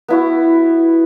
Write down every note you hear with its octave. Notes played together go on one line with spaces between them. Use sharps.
B3 E4 F#4